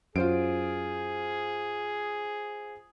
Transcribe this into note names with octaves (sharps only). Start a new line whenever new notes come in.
F#2 F4 G#4 C5 D7